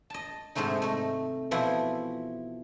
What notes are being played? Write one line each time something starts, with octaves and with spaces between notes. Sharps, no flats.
D#5 A5
G#2 C3 G#3 A3 D#4
A3 D#4
B2 E3 F3 E4